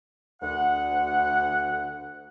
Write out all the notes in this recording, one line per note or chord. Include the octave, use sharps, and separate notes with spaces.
D2 F#5